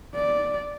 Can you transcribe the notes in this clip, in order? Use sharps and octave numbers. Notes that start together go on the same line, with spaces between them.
D5